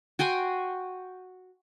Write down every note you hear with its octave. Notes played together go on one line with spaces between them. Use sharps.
F#4 G5 G#5 C6